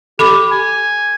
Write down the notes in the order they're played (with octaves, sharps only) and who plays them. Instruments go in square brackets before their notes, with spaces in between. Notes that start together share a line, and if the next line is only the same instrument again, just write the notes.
[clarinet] G4 [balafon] A4 B5 D6
[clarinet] G#5